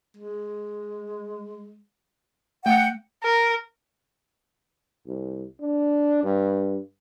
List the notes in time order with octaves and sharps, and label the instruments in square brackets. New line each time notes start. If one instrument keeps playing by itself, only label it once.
[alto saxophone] G#3
[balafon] A3 [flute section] F#5 [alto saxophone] G5
[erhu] A#4
[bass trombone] C2
D4
G2